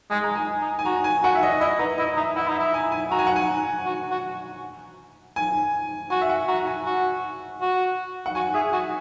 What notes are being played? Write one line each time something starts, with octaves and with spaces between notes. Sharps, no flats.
G#3 G#5
A#5
G#5
D#4
G#5
F#4 A#5
G#5
F#4 F#5
E5
D#5
E4 D#5
D#4 B4
E4 D#5
D#4 E5
E4 F#5
D#4
E4 E5
G#5
G#5
F#4 A#5
G#5
F#5
G#5
F#4
F#4
G#5
F#4 G#5
E5
F#5
F#4 A#5
G#5
F#4
F#4
F#5
F#4 G#5
G#4 E5
F#4 G#5